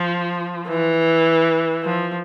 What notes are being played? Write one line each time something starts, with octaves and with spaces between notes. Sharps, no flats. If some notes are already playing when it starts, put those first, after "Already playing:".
Already playing: F3
E3
F3